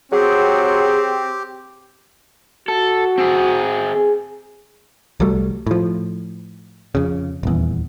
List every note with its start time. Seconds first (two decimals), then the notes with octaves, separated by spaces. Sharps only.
0.12 F#3 C4 G4 G#4
2.68 F#4 A4
3.18 C4 G#4
3.93 G#4
5.20 C2 F#3 G3 A3
5.67 A2 F3
6.95 F2 C#3
7.43 D#1 E2